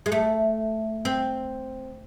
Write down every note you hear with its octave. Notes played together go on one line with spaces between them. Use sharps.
G#3
A3
C4